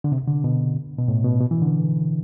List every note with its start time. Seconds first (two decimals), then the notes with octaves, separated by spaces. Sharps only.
0.04 D3
0.12 C3
0.28 D3
0.44 B2
0.99 B2
1.08 A2
1.24 B2
1.40 B2
1.51 E3
1.62 D3